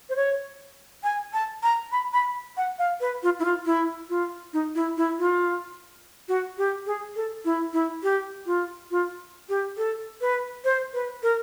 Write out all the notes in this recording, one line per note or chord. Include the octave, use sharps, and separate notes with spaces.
C5
C#5
G#5
A5
A#5
B5
B5
F#5
F5
B4
F4
E4
F4
E4
F4
D#4
E4
E4
F4
F#4
G4
G#4
A4
E4
E4
G4
F4
F4
G4
A4
B4
C5
B4
A#4